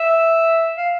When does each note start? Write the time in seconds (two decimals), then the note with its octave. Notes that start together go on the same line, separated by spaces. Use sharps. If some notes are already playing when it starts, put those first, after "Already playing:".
Already playing: E5
0.78 F5